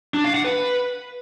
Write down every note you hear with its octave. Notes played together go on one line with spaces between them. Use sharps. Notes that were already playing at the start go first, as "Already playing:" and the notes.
D4
F5
F#5
B4